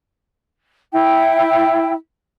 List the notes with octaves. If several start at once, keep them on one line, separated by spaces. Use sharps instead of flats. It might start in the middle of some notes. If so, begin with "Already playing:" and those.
E4 G5